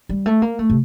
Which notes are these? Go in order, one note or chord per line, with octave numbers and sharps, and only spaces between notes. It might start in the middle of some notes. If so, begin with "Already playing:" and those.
G3
A3
A#3
A3
C3